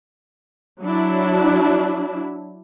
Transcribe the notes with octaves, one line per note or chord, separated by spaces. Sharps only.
F#3 D4 E4